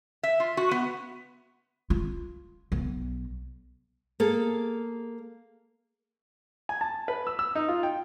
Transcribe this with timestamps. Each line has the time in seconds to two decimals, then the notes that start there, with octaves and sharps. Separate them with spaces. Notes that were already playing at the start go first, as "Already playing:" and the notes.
0.23 E5
0.40 F4
0.57 F#4
0.71 B3
1.90 F4
2.72 B1
4.20 A#3 G#4 A4
6.69 G#5
6.81 A5
7.08 B4
7.27 E6
7.39 E6
7.55 D#4
7.68 F4
7.83 G5